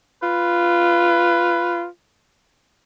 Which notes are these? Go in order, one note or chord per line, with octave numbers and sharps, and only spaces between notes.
F4 B4